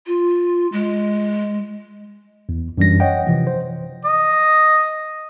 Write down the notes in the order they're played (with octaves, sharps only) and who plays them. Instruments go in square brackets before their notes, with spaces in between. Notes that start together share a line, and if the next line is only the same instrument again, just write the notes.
[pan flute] F4
G#3
[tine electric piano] E2
F#2 E3 G3 D4 A#6
C#5 D#5 F#5 G5
C3 E3 F3
C5
[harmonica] D#5